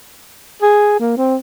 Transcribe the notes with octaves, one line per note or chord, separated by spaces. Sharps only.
G#4
A#3
C4